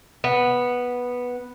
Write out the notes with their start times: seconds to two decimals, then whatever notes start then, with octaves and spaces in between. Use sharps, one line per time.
0.24 B3